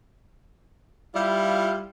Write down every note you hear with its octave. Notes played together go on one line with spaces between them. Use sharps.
G3 E4 F4